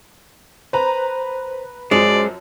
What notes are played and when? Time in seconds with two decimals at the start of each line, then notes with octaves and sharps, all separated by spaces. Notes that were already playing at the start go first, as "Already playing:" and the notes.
0.73 B4 C5 A#5
1.91 F#2 F3 G#3 C5 D5